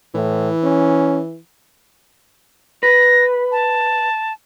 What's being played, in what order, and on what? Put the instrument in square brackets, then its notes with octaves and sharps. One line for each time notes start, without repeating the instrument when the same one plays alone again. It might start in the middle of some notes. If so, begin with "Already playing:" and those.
[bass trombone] A2 [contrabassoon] E3
[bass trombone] C#4
[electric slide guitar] B4 [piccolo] A#6
[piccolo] A5